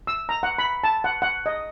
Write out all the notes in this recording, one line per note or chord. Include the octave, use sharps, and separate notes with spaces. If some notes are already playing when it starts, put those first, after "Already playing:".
E6
A#5
F#5
B5
A5
F#5
F#5
D#5